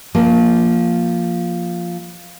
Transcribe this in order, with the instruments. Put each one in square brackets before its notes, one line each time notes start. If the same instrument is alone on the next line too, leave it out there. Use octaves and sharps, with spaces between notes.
[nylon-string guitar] F3 A#3